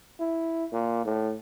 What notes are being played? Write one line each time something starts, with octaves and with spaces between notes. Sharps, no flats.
E4
A#2
A2